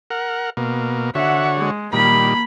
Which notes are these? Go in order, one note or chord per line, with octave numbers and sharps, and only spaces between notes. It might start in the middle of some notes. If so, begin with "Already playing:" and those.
A#4 F#5
B2 A#3
D3 F#4 C#5 E5 F#5
G#3
A#2 D#3 G3 A#3 B5